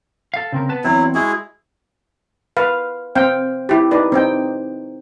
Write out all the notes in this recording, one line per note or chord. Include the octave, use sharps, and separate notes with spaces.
A4 F5
C#3 C4 A#4
B3 B4 A5
E2 F#3 C4 E4
G#3 E4 F#4 G#4
B4 F5
C4 F5 G5
E4 G4
D#4 B4 D5
C4 D#4 G5